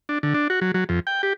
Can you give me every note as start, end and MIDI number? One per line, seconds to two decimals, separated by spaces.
0.09 0.18 62
0.23 0.34 50
0.34 0.48 62
0.50 0.60 66
0.61 0.72 54
0.74 0.84 54
0.89 1.00 41
1.07 1.22 79
1.23 1.33 67